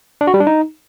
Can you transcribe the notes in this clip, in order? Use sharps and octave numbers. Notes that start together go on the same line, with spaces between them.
D4
F#4
G3
D4
D#4